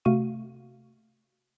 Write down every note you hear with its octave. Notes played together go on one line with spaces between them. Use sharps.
C3 A3 F#4 F5 C#6 D#7